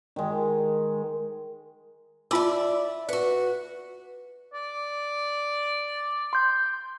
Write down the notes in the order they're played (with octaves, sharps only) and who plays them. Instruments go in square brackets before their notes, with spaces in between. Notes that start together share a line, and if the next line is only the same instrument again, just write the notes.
[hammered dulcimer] D#3 G#3
[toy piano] F4 A5 E6 [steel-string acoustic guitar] D5 E5
[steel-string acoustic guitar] F#4 F#5 [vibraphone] B4
[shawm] D5
[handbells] C6 G6